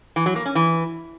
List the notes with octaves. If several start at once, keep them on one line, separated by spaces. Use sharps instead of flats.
E3
F#3
A#3
C#4
E3